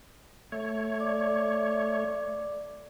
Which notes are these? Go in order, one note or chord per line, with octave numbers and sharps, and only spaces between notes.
A3 C#5
D5 D6